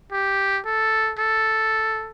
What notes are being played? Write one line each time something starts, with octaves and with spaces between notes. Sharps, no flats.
G4
A4
A4